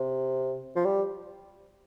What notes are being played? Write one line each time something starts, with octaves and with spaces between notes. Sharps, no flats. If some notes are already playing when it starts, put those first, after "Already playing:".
Already playing: C3
F3
G3